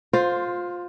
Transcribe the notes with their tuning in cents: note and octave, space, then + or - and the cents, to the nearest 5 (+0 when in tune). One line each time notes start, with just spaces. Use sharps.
F4 +20 C5 +0